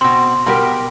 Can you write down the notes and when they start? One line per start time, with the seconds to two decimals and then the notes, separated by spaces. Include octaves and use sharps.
0.01 B2 C4 C6
0.46 B2 G3 G4 A#4 B5